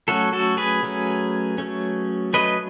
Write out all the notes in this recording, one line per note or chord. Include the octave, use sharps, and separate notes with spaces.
F#3 A3 C#4 F#4 A4
F#4 A4
G#4 B4
F#3 A3 C#4
F#3 A3 C#4
F#3 A3 C#4 B4 D#5